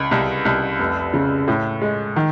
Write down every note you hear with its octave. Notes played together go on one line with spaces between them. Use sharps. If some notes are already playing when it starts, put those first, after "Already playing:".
Already playing: C#2
C2
C2
F1
C#3
A2
G#3
D#3